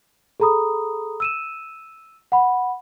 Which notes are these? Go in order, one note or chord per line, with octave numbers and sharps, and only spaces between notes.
G#4 A4 A#5 B5 D#6
E6 D#7 E7
F#5 B5